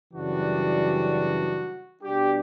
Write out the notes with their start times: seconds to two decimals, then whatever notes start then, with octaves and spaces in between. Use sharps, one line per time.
0.12 F#2 C#3 E3 G3 D4 F#4
2.02 B2 G3 D4 G4